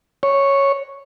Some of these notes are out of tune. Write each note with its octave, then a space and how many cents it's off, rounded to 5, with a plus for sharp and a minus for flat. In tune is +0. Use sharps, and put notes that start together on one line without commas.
C#5 -5